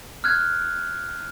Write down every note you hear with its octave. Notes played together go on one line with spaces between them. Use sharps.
F6 F#6 G#6